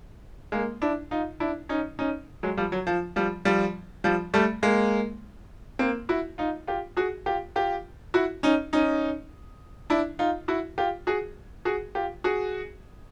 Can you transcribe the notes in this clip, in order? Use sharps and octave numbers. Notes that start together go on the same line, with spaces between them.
G#3 A#3
D4 E4
D#4 F4
D4 E4
C#4 D#4
C#4 D#4
F#3 G#3
F3 G3
F#3
F3
F3 G3
F3 G3
F3 G3
G3 A3
G#3 A#3
A#3 C4
E4 F#4
D#4 F4
F4 G4
F#4 G#4
F4 G4
F4 G4
E4 F#4
C#4 D#4
C#4 D#4
D4 E4
D#4 F4
E4 F#4
F4 G4
F#4 G#4
F#4 G#4
F4 G4
F#4 G#4